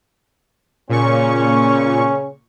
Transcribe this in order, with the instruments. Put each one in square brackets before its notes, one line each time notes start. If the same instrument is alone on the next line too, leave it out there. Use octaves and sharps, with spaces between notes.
[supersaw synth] A#2 C#6 [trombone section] C#3 C#4